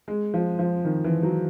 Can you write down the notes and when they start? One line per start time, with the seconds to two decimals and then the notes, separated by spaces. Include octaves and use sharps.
0.08 G#3
0.34 F3
0.59 F3
0.85 D#3
1.04 E3
1.23 F#3